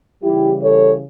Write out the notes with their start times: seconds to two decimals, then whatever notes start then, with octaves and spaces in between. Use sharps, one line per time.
0.22 C#3 E3 G3 E4 G4
0.62 A4 C#5